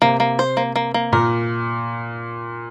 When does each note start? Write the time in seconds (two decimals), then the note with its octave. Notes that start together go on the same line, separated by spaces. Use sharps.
0.02 C3 A#3
0.20 A#3
0.39 C5
0.57 A#3
0.76 A#3
0.94 A#3
1.12 A#2 A#4